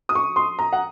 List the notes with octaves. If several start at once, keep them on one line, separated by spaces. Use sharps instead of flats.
D#6
C#6
C6
A#5
F#5